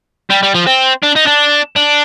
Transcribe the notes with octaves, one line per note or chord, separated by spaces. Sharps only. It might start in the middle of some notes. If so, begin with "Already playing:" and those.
G3
G3
F3
C4
D4
D#4
D4
D4